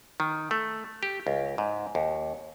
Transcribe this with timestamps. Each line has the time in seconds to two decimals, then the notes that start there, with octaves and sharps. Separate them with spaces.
0.20 D#3
0.51 A3
1.03 G4
1.27 C#2
1.58 G#2
1.95 D#2